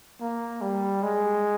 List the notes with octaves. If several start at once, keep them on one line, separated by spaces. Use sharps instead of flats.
A#3
G3
G#3